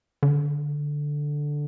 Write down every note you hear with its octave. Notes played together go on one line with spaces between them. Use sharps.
D3